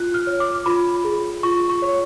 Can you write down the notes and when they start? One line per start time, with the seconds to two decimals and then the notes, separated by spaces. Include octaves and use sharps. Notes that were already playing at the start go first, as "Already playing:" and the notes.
Already playing: F4 F#6
0.14 F6
0.27 C#5
0.40 D6
0.66 F4 B5
1.04 G#4
1.43 F4 C#6
1.70 C#6
1.82 C#5